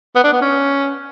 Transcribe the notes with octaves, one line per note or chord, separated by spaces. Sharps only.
B3
D4
B3
C#4